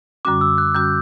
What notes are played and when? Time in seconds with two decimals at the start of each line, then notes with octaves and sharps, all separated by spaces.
0.25 F#2 D3 G3 C#4 F#4 D6
0.41 E6
0.58 F#6
0.75 F#2 D3 G3 C#4 F#4 G6